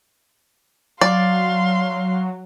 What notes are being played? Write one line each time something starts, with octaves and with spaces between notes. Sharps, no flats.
F#3 D5 F5 C6